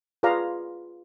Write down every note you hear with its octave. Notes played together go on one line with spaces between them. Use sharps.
F4 G#4 B4 D5 F5 A#5